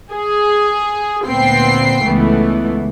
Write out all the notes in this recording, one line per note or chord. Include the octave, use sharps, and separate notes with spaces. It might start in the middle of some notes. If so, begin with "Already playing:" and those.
G#4
D2 A#2 B3 C4 G5 C7
C#2 E3 A3 B3